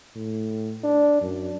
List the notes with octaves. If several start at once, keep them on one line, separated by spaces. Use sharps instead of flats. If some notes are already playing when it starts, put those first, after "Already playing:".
A2
D4
F#2